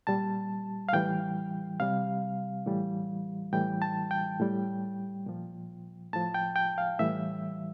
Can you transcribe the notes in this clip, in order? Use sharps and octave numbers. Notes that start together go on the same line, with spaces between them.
A#2 G3 A5
F5
A2 E3 G3 G5
C3 G3 F5
A2 E3 G3
A2 E3 G3 G5
A5
G5
A2 G3
A#2 F3
A2 F3 A5
G5
G5
F5
A2 E3 G3 E5